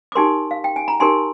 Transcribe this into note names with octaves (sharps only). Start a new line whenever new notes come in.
D6
D#4 G4 A#4 G#5 C6
F5
G5
G#5
A#5
D#4 G4 A#4 G#5 C6